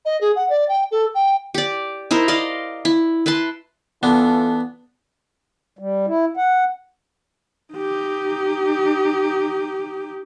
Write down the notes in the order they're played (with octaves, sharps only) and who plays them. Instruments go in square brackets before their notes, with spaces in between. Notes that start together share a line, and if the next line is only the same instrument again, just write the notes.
[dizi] D#5
G#4
F#5
D5
G5
A4
G5
[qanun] G4 D5
D#4 E4 A#4 C5
D5 D#5 F5 C6
E4
E4 B4 A5 C6
[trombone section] E3 F4 A4 [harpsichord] B3 D4
[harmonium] G3
E4
F#5
[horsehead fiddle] D#4 G4